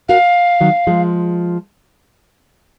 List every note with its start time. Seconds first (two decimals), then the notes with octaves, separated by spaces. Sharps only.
0.09 F#4 A#4 F5
0.61 D#3 F#3
0.87 F3 G#3